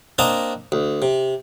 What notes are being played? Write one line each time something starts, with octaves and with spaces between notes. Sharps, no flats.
A#3 C4 D4 D#5 A5 A#5
D2
C3